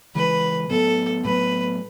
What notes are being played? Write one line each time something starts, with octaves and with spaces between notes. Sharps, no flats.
C#3 E3 G#3 B4
A2 F#3 B3 A4
A2 F#3 B3 B4